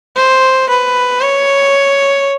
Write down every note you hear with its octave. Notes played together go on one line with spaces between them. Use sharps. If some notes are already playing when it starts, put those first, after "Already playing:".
C5
B4
C#5